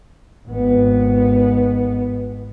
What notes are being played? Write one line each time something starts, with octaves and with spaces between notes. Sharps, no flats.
G#1 B3